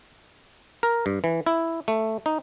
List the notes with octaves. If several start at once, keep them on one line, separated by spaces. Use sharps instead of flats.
A#4
G2
E3
E4
A3
D#4